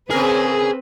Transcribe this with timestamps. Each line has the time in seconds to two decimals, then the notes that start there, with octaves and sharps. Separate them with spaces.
0.10 C#3 C4 G#4 A#4 B4